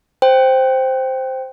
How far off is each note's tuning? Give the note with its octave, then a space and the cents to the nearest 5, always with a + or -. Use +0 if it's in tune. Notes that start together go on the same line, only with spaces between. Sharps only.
C5 +0 G5 +0